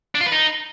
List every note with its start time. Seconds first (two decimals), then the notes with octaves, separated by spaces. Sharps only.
0.15 D4
0.21 F4
0.26 B4
0.32 D#4